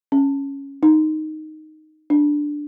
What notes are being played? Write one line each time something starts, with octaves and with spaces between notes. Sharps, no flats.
C#4
D#4
D4